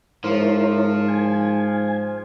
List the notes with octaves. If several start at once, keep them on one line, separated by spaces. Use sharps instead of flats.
G#2 F3 E4 A#4 C#5
G#5